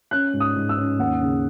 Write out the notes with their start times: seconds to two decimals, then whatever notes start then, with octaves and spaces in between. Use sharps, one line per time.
0.11 C#4 F#6
0.33 G#2
0.40 D#6
0.56 G#2
0.69 E6
0.78 C#4
0.99 D#2 F#5
1.21 C#3